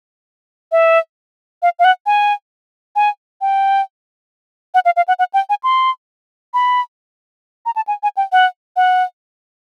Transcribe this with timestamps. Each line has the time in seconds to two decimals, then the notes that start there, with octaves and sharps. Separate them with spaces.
0.72 E5
1.62 F5
1.79 F5
1.84 F#5
2.06 G#5
2.96 G#5
3.41 G5
4.74 F#5
4.85 F5
4.96 F5
5.08 F#5
5.19 F#5
5.34 G5
5.49 G#5
5.63 C6
6.54 B5
7.66 A#5
7.76 A5
7.88 G#5
8.03 G#5
8.17 G5
8.32 F#5
8.76 F#5